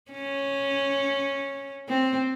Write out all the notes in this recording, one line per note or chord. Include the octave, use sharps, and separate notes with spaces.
C#4
C4